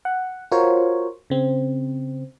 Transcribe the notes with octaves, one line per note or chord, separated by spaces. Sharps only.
F#5
F4 F#4 A#4 C5 C#5
C#3 C4